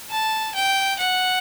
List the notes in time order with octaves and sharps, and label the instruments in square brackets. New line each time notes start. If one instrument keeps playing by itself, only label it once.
[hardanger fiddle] A5
G5
F#5